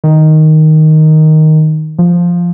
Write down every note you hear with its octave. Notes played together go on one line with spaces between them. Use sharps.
D#3
F3